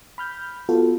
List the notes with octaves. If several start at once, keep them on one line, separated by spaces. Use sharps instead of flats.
B5 F6 G6
B3 F4 F#4 A4